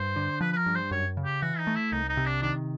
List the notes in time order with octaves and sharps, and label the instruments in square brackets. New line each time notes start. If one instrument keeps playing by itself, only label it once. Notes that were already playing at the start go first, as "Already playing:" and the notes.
Already playing: [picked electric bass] G2 [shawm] C5
[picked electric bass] D3
[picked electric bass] F3 [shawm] B4
[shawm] B4
A#4
[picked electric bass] G2
[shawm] C5
[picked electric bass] F#2 [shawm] C#5
[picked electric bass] C#3
[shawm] G4
[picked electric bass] E3 [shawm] F#4
[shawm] D#4
[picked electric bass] A3
[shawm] E4
[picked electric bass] C2 [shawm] D#4
[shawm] D#4
[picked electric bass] C3
[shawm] D4
[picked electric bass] D#3 [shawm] D4